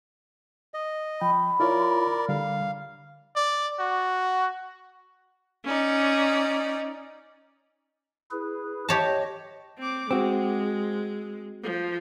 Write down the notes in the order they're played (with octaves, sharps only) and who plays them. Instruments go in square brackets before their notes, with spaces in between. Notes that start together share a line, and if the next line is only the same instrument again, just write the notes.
[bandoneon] D#5
[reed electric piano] F3 G5 [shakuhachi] B5
[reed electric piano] E4 F4 C#5 [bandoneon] A#4 D5
[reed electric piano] D3 G3 D4 [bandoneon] F5
[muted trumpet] D5
F#4
[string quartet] C#4 D#4 D5
[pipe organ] E4 G#4 B4
[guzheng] G4 C#5 A5 [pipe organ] D#5
[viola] C4 D6
[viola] G#3 [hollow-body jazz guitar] C4 F#4
[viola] F3